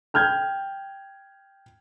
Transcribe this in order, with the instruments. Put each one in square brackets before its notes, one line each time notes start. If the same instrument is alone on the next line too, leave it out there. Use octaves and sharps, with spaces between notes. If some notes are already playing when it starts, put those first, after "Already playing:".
[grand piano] G5 F6 G6 G#6